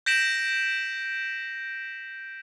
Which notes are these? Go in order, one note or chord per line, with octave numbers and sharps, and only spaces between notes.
G6 A#6 B6 D7 E7 F#7